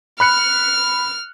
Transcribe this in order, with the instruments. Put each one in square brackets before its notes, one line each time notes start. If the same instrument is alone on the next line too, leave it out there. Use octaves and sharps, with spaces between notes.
[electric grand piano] B5 F#6 C#7 [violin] F6